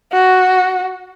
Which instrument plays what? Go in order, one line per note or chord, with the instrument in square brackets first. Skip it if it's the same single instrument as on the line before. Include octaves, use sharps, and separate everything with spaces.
[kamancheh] F#4